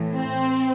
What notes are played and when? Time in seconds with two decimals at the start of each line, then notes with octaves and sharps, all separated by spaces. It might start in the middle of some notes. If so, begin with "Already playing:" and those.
Already playing: A2 E3
0.14 C4 C5